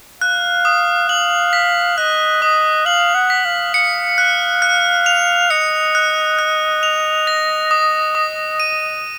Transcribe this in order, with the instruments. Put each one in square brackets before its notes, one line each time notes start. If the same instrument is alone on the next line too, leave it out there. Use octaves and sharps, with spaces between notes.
[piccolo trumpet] F5 [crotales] F#6
[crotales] D#6
[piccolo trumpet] F5 [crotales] F#7
[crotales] B6
[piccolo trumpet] D#5 [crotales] F#6
[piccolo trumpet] D#5 [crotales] D#6
[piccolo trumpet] F5 [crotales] F#7
[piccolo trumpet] F#5
[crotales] B6
[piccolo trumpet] F5
[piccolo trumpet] F5 [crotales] C#7
[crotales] F#6
F#6
F7
[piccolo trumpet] D#5 [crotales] C#7
[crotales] F#6
F#6
F7
A#6
D#6
D#6
D#7